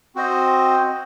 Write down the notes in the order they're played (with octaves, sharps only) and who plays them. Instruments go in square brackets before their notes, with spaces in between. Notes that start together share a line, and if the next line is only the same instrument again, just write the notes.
[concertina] C4 F#4 C5 D#5